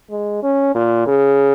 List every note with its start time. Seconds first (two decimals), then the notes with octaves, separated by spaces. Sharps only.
0.10 G#3
0.43 C#4
0.75 A#2
1.07 C#3